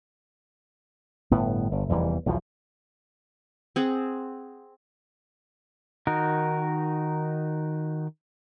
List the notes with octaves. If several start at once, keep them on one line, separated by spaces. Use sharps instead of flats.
G1 A2 B3
G1
F1 E2 E3 G3
B1 E2 B2 F3
C4 G#4 F#5
D#3 D#4 F#4 A#4